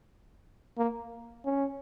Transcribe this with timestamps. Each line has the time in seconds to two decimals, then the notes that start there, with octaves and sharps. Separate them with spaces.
0.78 A#3
1.45 C#4